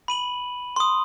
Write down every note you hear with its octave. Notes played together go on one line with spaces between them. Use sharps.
B5 D#7 F#7
C6 D#6